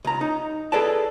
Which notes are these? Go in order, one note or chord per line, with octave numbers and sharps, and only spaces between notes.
C#2 A#5
D#4
G#4 A4 B4 D5 A5